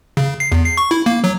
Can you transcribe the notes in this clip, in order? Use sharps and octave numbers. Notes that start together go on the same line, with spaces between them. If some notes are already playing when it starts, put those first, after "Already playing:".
C#3
C7
E2
C7
C#6
E4
A#3
F#3